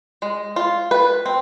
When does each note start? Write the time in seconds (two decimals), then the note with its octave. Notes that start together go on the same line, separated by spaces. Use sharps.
0.22 G#3
0.56 F4
0.91 B4
1.26 C4